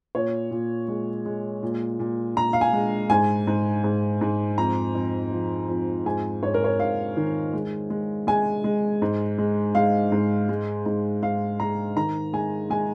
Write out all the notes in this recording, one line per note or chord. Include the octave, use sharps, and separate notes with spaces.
A#2 C#5
A#2
G#3
G#3
A#2
A#2
A#2 A#5
F5
G#5
G#3
G#2 G#5
G#2
G#2
G#2
F2 A#5
F2
F3
F2
G#2 G#5
G#2 C#5
A#4
C#5
G#2 F5
D#3
G#3
G#3
G#3 G#5
G#3
G#2
G#3
G#3 F5
G#2
G#3
G#2
G#2 F5
G#3 A#5
D#3 A#5
G#3 G#5
G#3 G#5